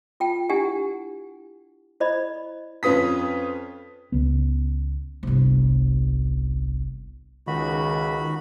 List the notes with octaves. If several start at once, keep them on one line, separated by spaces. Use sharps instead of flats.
F4 G5 A5
D4 E4 G4 F#5 G#5
E4 C5 D5 D#5 B5
F2 C#4 F4 B4 D#6 B6
C#2 B3
G1 C2
C#2 D#3 F#4 B5